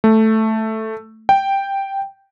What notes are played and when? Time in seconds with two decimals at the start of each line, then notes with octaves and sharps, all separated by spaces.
0.04 A3
1.29 G5